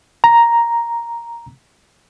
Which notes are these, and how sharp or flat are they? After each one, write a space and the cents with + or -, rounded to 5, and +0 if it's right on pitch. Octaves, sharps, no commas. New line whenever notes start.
A#5 +5